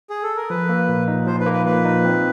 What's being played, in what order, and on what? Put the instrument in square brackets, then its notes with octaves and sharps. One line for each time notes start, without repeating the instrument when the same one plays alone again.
[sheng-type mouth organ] G#4
A4
A#4
[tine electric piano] F3 [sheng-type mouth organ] B4
[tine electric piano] A#3
A#2
D#4
[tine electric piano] F3 [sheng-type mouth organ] C5
[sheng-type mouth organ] B4
[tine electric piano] A#3
[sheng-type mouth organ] B4
[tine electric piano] A#2 [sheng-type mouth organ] B4
[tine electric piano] D#4
C4